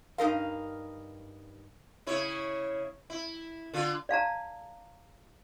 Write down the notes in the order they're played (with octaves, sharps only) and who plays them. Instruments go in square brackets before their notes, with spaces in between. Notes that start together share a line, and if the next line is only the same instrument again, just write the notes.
[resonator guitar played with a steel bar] G2 D#4 A#4 F5
[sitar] C#3 E4 C#5
E4
D3 F4
[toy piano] D5 F5 A5 A#5